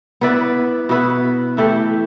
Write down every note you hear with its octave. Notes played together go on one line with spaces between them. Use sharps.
B3 E4 B4 D5
B2 B3 E4 B4
E3 A3 E4 G4